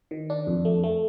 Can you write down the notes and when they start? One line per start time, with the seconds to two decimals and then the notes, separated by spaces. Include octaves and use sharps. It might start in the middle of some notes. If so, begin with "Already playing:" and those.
0.11 D#3
0.30 D4
0.47 F2
0.65 A3
0.83 A3